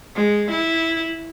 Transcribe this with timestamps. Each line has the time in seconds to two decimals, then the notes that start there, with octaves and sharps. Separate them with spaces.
0.15 G#3
0.51 E4